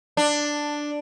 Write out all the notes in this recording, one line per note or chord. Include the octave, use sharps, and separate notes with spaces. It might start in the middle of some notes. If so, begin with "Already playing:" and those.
D4